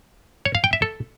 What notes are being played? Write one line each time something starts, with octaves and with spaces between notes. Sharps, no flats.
C#5
F5
G5
E5
A4